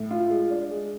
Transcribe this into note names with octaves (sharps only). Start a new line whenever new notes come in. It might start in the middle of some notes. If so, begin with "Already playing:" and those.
Already playing: A2
F4
G#3
D4
G#3